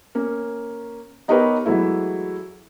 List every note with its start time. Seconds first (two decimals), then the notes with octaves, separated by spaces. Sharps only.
0.15 A#3 C#4
1.28 B3 D#4 G4 A#4 B4 C#5
1.65 E3 F#3 G#3 A3 E4